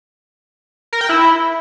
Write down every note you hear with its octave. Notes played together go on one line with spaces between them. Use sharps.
A#4
G5
E4